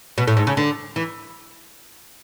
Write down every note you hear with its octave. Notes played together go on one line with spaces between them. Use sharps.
B2
A2
G#2
C#3
D3
E3